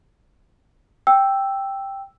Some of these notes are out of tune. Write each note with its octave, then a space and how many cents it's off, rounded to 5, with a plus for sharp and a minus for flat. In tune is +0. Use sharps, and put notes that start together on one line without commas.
G5 +0 E6 +0